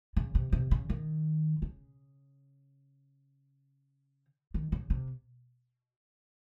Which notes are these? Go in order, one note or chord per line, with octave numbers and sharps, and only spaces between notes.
C#3
C3
C3
C#3
D#3
C#3
D#3
C#3
C3